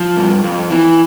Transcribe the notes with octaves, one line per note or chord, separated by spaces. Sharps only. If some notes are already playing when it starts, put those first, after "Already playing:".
Already playing: F3
G2
F2
E3